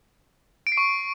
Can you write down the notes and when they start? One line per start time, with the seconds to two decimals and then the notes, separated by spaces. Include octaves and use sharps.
0.67 D7
0.72 C7
0.77 C#6